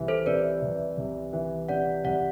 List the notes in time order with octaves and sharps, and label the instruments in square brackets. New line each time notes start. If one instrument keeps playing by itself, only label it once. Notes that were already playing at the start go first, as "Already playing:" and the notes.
Already playing: [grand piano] C2 E3
[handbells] A4 C5
[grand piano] C3 [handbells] B4 D5
[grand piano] C2
C2
E3
[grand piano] C3 [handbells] D5 F#5
[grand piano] C2 [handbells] D5 F#5